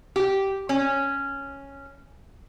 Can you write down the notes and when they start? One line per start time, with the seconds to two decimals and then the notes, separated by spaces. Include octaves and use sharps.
0.16 G4
0.69 C#4